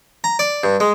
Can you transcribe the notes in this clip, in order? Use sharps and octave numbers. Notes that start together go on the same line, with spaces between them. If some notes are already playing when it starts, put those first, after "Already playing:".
A#5
D5
G2
G#3